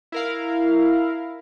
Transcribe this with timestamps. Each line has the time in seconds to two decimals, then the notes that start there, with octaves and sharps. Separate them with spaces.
0.12 E4 A#4 F5